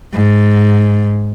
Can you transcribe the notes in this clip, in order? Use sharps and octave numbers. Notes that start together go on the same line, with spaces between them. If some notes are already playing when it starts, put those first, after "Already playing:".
G#2